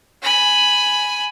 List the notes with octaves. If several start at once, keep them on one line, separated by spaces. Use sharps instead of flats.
G#5 B5